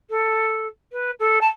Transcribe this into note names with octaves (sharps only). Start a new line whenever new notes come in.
A4
B4
A4
A5